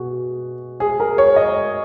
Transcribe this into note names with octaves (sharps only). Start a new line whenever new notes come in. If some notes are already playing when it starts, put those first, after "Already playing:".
Already playing: B2 F#4 G#4
G#4
A#4
C#5
D#5